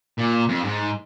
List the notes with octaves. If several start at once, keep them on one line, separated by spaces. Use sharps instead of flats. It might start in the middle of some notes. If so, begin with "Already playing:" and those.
A#2
F2
G#2